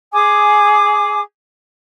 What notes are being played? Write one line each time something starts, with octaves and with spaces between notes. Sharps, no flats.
G#4 G#5 D6 D#6